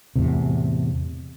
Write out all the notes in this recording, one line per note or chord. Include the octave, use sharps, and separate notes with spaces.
E2 A2 C3